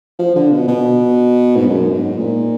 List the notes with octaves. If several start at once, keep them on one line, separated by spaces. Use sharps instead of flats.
F3
D3
B2
B2
G#2
F#2
G#2
A#2